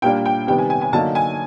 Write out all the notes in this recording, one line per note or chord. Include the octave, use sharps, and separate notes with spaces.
A#2 G3 A#3 D4 G5
G5
C3 D#3 G3 B3 G5
G#5
G#5
G#5
D3 F#3 A#3 D#4 A5
G#5